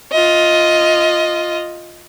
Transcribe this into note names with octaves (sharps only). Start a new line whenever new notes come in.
F4 D#5